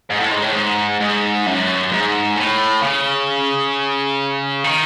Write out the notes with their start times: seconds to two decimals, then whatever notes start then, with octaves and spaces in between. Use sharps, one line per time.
0.10 G#2
0.20 A2
0.32 G#2
0.43 A2
0.53 G#2
1.00 G#2
1.46 F#2
1.92 G#2
2.36 A2
2.82 C#3
4.64 D#3